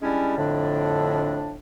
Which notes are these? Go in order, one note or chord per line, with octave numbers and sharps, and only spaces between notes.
G3 G#3 C#4 D4 E4
F2 A2 D3 D4